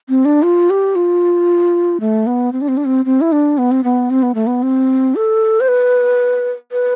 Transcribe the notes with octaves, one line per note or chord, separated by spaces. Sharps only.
C4
D4
F4
G4
F4
A3
B3
C4
D4
C4
D4
C4
C4
E4
D4
B3
C4
B3
C4
B3
A3
B3
C4
A4
C5
B4
B4